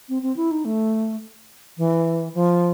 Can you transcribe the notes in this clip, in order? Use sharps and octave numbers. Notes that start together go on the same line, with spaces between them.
C4
C4
E4
D#4
A3
E3
F3